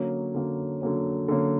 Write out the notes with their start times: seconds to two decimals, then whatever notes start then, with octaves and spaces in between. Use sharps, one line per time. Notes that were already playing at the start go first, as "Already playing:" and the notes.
Already playing: D3 F#3 A#3 C#4
0.34 D3 F#3 A#3 C#4
0.81 D3 F#3 A#3 C#4
1.28 D3 F#3 A#3 C#4